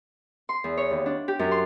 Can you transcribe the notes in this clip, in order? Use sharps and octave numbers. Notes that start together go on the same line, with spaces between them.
C6
E2
C#5
D#2
D4
G4
F#2
C6